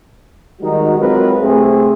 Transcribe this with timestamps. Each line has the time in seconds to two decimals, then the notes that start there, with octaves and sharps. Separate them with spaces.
0.61 D#3 G3 G#3 D#4 F#4
0.99 F#3 G#3 C4 F4 A#4 B4
1.42 C2 A3 C4 G#4